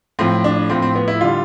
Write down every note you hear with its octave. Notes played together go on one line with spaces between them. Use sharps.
A2 F3 C4
D4
A2 F3 C4
C4
B3
E4
D3 G3 F4